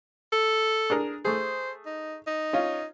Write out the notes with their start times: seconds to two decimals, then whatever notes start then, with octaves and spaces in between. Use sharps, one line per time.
0.33 A4
0.90 D4 G#4 A#4
1.25 A3 G#4 C5
1.86 D#4
2.27 D#4
2.53 C#4 F4